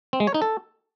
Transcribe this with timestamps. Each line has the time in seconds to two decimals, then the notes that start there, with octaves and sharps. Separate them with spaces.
0.13 C4
0.20 G#3
0.27 C#5
0.34 D#4
0.42 A4